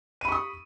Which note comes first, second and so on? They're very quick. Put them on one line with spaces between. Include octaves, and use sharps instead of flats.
D#7 B5 C#6 D#6